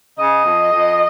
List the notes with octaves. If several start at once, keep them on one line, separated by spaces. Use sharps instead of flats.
C#3 D#5
F2
F2